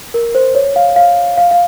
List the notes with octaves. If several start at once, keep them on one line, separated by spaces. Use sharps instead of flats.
A#4
C5
C#5
F5
F5
F5
F5